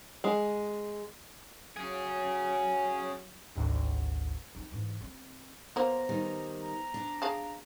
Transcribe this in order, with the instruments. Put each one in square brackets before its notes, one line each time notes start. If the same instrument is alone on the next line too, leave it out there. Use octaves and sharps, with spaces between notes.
[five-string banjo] G#3
[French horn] F#3 [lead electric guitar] C#4 G#4
[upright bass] G#1 D2
C4 D#4
G#2 E3
C4
[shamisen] F#3 A#3 [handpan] B3 C5 [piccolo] A#5
[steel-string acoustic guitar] D#3 G3
[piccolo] A#5
[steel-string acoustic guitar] D4
[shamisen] G#4 F5 A5